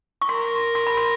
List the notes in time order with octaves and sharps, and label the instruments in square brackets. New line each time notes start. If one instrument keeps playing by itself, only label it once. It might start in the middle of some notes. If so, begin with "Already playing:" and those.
[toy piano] C#6
[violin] A#4 [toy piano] C6
[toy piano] C6
B5
C6